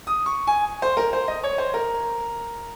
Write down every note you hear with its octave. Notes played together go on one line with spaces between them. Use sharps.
D#6
C#6
G#5
C5
A#4
C5
D#5
C#5
C5
A#4